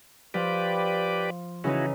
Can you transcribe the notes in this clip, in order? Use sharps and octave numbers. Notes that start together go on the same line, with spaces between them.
F3 G4 B4 D5
C#3 E3 D#4 E4 F#4